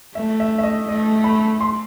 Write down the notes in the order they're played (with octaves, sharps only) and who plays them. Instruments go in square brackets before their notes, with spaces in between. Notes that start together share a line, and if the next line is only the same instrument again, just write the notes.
[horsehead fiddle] A3 [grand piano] E5
[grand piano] E5
E5
D#5
[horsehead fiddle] A3 [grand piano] D#5
[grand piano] B5
C6